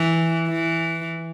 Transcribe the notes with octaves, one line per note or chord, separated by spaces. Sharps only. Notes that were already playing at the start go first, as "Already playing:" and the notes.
Already playing: E3
E3